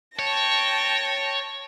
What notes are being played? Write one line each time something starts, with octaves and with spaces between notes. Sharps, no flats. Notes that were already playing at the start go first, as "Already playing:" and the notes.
C#5 G5 A5 A#6